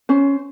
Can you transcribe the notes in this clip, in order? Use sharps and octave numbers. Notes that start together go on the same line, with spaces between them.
C#4 C5